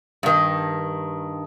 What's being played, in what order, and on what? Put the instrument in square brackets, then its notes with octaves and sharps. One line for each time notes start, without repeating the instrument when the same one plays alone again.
[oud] G2 D#3